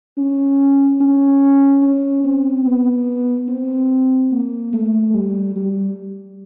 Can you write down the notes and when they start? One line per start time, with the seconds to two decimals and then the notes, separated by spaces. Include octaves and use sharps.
0.17 C#4
1.01 C#4
1.83 C#4
2.24 C4
2.66 B3
3.48 C4
4.32 A#3
4.73 A3
5.14 G3
5.56 G3